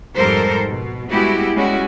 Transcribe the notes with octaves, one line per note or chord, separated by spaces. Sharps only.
F2 G#2 G3 A4 A#4 C5
B2
G3 G#3 B3 E4 F#4 G4
G3 G#3 C#4 E4 F#4